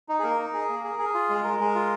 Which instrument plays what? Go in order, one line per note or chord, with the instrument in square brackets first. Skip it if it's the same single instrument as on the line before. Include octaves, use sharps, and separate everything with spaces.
[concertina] D#4
G#4
A#3 A#4
D#4
G#4
A#3
G#4
G#4
F4
G#3
G#3 A#4
G#3
F4